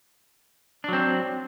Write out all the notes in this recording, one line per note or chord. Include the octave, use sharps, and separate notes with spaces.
F#3 C4 D4